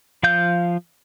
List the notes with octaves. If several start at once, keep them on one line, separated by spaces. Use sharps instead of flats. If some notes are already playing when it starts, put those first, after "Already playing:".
F3 F5 G6